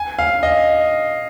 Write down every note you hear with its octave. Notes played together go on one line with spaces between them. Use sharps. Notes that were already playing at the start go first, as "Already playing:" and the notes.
Already playing: G#5
F5
D#5